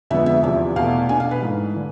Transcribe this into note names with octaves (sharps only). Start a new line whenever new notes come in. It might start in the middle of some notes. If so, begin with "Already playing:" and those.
F2 D3 G#3 B3 E5
E5
E2 C3 F3 E5
E2 B2 A3 F5
B2 B3 D4 G#5
F5
B4
G#2 E3 A3
D3